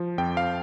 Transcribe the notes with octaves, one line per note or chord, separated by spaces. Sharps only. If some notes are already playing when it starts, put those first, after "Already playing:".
Already playing: F3
F2 G5
F5